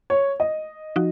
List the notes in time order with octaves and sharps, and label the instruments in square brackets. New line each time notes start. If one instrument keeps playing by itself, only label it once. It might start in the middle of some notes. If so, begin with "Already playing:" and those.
[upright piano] C#5
D#5
[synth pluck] F3 D#4 F#4